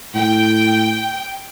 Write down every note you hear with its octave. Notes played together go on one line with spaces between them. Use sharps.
A2 G5